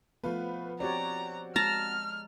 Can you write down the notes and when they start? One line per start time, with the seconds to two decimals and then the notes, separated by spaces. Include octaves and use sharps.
0.24 F3 A3 B3 F4 B4
0.80 C4 F#4 G4 C#5 D5 A#5
1.56 G#3 A5 A#5 F6